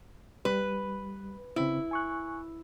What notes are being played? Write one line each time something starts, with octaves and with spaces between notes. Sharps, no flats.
G3 B4
C#3 C4 E4
G#5 C#6 F#6